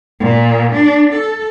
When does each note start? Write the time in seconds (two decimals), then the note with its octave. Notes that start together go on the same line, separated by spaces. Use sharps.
0.20 A#2
0.74 D4
1.13 A4